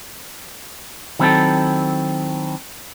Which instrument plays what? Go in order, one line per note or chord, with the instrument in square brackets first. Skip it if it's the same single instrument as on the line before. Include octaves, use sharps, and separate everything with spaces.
[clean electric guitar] D#3 F#3 C4 C#4 E4 A4